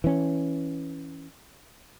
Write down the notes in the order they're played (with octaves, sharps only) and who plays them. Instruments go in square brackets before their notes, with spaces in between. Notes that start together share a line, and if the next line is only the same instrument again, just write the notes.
[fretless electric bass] E3 C#4